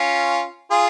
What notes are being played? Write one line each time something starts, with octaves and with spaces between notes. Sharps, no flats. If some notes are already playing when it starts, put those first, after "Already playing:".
Already playing: C#4 F4
F4 G#4